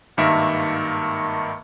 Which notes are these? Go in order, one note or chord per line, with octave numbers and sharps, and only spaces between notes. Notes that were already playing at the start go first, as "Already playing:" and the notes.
G#1 G2 D#3 A#3 A#4 E5